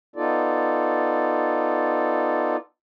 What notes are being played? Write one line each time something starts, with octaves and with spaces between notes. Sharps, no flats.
B3 D#4 F4 A4 D5